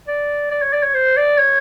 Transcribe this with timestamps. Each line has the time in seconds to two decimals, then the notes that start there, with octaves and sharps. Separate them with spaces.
0.08 D5
0.51 D5
0.62 C#5
0.73 D5
0.83 C#5
0.94 C5
1.17 D5
1.39 C#5